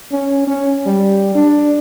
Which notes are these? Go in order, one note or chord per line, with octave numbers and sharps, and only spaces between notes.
C#4
C#4
G3
D4